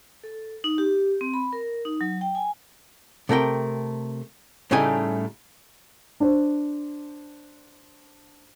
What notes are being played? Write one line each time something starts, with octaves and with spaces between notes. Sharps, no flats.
A4
D#4
G4
C4
B5
A#4
D#4
F#3
G5
G#5
C3 A3 A#4 G5
A2 C#3 G3 A3 D#4 G#5
D4 C5